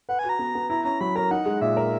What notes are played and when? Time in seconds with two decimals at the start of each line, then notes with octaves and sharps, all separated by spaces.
0.09 B4 F#5
0.19 G#5
0.24 F#4
0.29 A#5
0.39 B3
0.55 B3
0.70 E4 A#5
0.85 C#4 A#5
1.01 F#3 B5
1.16 A#4 A#5
1.31 D#4 F#5
1.46 G#3
1.61 A#2 E5
1.77 A#4